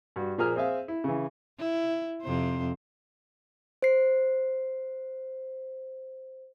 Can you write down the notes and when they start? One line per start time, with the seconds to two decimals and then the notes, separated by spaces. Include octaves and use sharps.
0.16 G2 F#4
0.38 A#2 F3 A#3 G#4 A#5 F6
0.56 C4 G#4 E5 F5
0.88 E4
1.04 C#3 E3
1.59 E4
2.22 F2 C3 C5
3.82 C5 C7